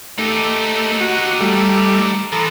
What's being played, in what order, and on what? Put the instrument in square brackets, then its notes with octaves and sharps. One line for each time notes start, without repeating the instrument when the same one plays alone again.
[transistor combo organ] A3 [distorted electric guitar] D#4 G4
[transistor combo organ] F#4
G3 A3
[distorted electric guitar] E3 F3 [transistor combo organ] A4 A#5